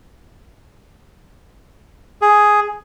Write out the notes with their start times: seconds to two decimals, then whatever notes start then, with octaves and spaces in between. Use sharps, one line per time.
2.22 G#4